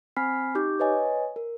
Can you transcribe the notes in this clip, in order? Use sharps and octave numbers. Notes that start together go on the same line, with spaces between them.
C4 G#5 B5 F6 B6 C7
D#4 G4 D6 G6
B4 C#5 D#5 G#5
A#4